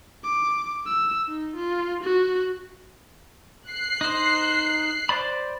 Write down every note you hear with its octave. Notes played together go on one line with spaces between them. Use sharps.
D6
E6
D#4
F4
F#4
F#6 C7
D#4 C5
C5 D5 B5